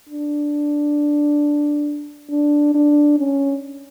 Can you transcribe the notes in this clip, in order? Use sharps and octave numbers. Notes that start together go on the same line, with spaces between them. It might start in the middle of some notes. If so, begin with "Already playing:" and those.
D4
D4
D4
C#4